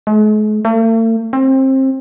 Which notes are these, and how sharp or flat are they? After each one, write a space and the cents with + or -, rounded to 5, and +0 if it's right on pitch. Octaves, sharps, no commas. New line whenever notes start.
G#3 +45
A3 +45
C4 +25